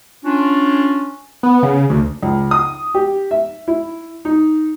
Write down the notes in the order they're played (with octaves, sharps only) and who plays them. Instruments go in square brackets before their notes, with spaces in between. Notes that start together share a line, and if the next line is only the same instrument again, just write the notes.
[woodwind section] C#4 D4 F4
[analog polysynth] B3
C#3
D2
[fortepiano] C#2
D#6
G4
E5
E4
D#4